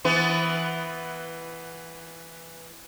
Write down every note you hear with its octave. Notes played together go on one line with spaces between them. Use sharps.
E3 B3 B4